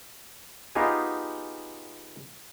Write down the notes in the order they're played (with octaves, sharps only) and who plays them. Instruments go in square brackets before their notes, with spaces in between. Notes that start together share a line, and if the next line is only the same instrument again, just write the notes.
[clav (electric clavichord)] B3 D#4 F4 G4 G#4 G#5